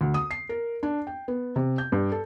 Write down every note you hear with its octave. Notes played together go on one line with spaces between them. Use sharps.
D2
D#6
C7
A#4
D4
G5
B3
C3
G6
G2
A4